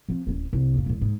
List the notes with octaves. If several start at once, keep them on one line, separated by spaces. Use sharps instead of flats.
F3 C4
D1 C#4
C2
F2 A#2
E1 A#2
G#2